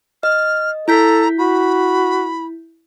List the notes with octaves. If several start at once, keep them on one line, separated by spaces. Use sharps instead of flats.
D#5 F6
E4 A4 A#5 G6 B6
F#4 B5